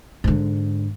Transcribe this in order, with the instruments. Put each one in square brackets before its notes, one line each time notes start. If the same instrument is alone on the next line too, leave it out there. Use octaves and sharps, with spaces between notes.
[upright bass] G#2 D3